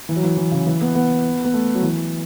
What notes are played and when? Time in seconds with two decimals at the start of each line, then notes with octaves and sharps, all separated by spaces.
0.09 E3
0.16 F#3
0.23 E3
0.37 E3
0.52 C#3
0.67 E3
0.81 B3
0.95 B3
1.45 B3
1.54 A3
1.75 F#3
1.83 E3